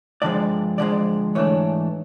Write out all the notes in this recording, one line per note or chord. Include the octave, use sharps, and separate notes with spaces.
G2 D3 F3 G#3 D5
G2 D3 F3 G#3 D5
G#2 E3 A3 D4 C#5